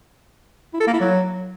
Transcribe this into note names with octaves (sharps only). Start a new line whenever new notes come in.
E4
A4
A#3
E4
F#3